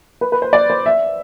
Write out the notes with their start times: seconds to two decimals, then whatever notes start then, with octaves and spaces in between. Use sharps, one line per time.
0.21 B4
0.32 B4
0.42 C5
0.53 D5
0.70 C5
0.86 E5